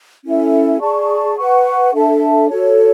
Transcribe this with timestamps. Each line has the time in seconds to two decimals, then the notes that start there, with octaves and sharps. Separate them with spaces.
0.24 C#4 E4 A4 E5
0.80 G#4 D5 A5 C#6
1.37 B4 F#5 C#6
1.93 D4 A4 E5 A5
2.49 F#4 A4 C#5